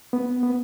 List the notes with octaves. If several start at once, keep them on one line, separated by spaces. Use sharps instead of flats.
B3
B3